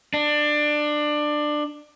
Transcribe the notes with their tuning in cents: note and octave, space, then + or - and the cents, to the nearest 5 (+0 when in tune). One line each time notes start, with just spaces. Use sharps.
D4 +20